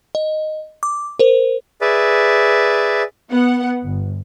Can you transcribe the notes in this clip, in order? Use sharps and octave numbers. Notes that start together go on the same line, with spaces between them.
D#5
D6
A#4 C5
G#4 B4 D5 E5
B3 F#5
G1